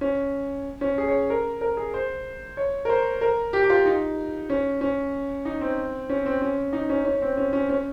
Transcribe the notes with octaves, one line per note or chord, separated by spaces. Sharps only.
C#4
C#4
G#4
C#5
A#4
A#4
G#4
C5
C#5
A#4
C5
A#4
G4
G4
F4
D#4
C#4
C#4
D#4
C4
C#4
C4
C#4
D#4
C#4
C#4
C4
C#4
C#4
C#4